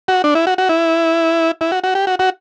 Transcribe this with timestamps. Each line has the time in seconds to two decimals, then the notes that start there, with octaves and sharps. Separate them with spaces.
0.08 F#4
0.24 D4
0.35 E4
0.47 F#4
0.58 F#4
0.69 E4
1.61 E4
1.72 F#4
1.84 F#4
1.95 G4
2.07 F#4
2.19 F#4